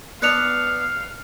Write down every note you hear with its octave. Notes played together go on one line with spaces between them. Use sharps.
B3 D4 F5 F#6 C#7 F7